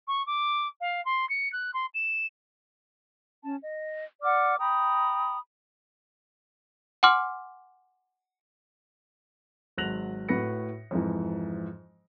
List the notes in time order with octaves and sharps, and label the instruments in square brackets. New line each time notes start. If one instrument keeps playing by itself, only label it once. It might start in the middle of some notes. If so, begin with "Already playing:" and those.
[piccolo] C#6
D6
F5
C6
C#7
F#6
C6
E7
[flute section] C#4 A5
D#5
D5 F#5 D6 F6
G5 A#5 B5 D#6
[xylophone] F#5 G#5 C6 D6 F6
[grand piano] G#1 F#3 F#6 A#6 F7 F#7
A2 F#4 B4 A#6 C#7
F2 G#2 E3